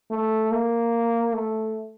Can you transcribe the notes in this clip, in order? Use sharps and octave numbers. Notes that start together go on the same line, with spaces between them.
A3
A#3
A3